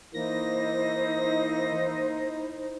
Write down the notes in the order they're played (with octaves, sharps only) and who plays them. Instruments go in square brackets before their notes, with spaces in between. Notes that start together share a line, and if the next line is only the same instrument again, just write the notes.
[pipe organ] E3 A#3 A#6 [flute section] D#4 E4 C5